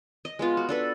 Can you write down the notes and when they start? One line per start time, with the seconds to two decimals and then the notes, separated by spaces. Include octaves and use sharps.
0.25 D#5
0.39 G#3 B3 F4
0.57 F#4
0.69 D4 A4 B4